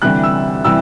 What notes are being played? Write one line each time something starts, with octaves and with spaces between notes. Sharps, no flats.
D2 C3 E3 G3 F#6
E6
C3 E3 G3 E6